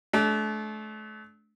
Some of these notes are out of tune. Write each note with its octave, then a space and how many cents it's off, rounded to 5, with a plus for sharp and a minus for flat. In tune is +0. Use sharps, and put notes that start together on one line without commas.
A3 -35 D4 -25